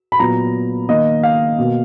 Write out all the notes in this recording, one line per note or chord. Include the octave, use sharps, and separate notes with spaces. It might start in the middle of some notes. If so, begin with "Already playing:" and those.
B5
A#2 F#3 B3 A#5
D#3 A#3 D#5
F5
B2 A#3